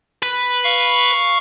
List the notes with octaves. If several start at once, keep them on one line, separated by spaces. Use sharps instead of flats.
B4
F5 C#6